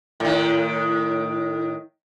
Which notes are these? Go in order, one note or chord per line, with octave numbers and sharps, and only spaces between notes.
A2 D#3